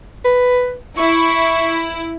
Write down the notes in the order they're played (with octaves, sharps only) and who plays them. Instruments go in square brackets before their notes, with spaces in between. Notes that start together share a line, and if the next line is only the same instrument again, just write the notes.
[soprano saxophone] B4
[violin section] E4 [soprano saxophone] C#6